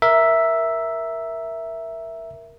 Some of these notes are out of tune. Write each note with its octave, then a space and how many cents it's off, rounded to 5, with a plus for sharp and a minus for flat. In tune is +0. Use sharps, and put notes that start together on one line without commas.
A#4 +5 E5 +0